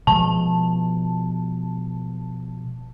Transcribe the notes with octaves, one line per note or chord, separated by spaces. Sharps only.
B2 F3 G#3 A5